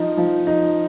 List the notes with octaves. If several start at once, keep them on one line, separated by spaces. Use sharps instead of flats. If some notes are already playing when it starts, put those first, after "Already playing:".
Already playing: F3 D#4
F3
D#4